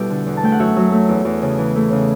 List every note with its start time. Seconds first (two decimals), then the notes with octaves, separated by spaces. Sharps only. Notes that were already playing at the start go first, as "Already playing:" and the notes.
Already playing: B2 G3 B3 E4 G4 A4 B4
0.10 D3
0.26 E2
0.37 A5
0.43 A3 G5
0.52 F#5
0.59 F#2 C#5 E5
0.76 F#3
0.92 A3
1.09 E2
1.25 E2
1.42 C#3
1.58 E3
1.76 A3
1.92 C#3